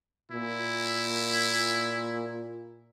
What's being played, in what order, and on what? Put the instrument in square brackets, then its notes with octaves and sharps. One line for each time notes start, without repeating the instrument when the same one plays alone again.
[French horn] A#2 [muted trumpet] E4